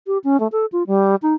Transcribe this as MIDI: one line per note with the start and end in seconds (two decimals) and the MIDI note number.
0.07 0.18 67
0.24 0.39 61
0.40 0.47 57
0.52 0.66 69
0.72 0.83 65
0.87 1.15 55
1.22 1.34 63